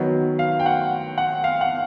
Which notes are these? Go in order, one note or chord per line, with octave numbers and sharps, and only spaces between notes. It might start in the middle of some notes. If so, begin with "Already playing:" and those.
Already playing: D#3 F#3 B3
F5
G5
F#5
F#5
F5
F#5